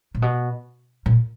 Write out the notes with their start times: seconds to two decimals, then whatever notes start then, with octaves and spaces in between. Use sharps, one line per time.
0.15 A#2
0.22 B2
1.06 A#2